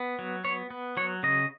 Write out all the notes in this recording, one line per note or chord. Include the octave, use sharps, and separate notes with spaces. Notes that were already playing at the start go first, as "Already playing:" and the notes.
Already playing: B3
F#3
B3 C#5
B3
F#3 C#5
C#3 D#5